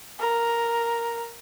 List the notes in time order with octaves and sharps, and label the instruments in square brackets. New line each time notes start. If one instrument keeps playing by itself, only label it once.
[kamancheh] A#4